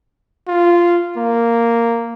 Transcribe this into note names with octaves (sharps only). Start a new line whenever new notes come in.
F4
A#3